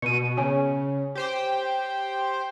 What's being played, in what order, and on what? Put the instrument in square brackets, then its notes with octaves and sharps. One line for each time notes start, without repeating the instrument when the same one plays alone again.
[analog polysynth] B2 [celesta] C#7 D#7
[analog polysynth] C#3 [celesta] C#5 G#5
[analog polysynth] G4 C5 G5